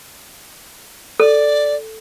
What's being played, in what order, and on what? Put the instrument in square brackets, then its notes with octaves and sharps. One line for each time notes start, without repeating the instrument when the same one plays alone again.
[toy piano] A4 [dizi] D5